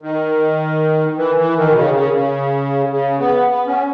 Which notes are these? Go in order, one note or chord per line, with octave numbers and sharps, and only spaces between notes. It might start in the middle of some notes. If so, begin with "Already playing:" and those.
D#3
E3
E3
D#3
B2
C#3
C#3
C#3
C#3
B3
B3
C#4